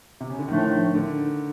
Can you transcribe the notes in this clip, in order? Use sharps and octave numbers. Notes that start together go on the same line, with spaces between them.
C3
C#3
D3
A2 D#3 F3 A3 D4
D3